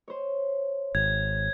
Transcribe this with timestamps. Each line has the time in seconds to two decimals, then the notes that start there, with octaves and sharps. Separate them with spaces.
0.08 C5 C#5
0.95 G#1 G#6